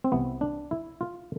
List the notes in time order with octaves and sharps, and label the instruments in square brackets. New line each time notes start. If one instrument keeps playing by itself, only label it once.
[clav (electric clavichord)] C4
C2 C3 E3 B3
D4
E4
F4